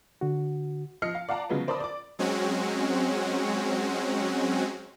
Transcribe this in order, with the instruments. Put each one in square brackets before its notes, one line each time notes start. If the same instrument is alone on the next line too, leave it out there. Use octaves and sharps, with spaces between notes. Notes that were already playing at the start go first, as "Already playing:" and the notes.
[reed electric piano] D3 F#4
[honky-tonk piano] F3 D#5 F6 C7 C#7
F5
D5 F5 F#5 A5 A#5
C#3 F3 F#3 G#3 B3
A#4 C5 D5 A5 B5 D#6
D5 D6
[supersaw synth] F#3 G#3 C4 C#4 F#4